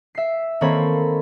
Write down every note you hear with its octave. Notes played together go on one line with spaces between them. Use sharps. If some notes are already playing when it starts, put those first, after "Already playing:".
E5 C7
D#3 A#3 C4 A4 C#5 B5